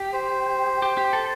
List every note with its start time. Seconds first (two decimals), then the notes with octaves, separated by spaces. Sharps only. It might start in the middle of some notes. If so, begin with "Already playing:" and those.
Already playing: G4
0.13 C5
0.82 G4
0.97 G4
1.13 A4